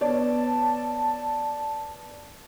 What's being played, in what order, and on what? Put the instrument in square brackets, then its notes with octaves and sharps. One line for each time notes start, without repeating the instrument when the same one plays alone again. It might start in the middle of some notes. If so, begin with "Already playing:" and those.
[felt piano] B3 C#5 D5 [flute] A5